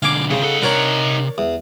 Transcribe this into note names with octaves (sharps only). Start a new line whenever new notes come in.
B1 D3 F5 G#5 D6
C#3 E3 C4
D#4 A4 F#5
C3 D4 A#4 C#5 A#5
E2